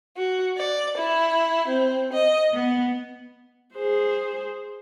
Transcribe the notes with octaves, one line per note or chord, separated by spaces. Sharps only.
F#4
D5
E4
C4
D#5
B3
G#4 C5